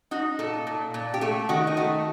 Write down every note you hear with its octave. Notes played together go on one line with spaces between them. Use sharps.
D#4 F#4
A#2 A4
A#2
A#2
G4
A3 A4
D#3 F#4
D#4
A3 F#4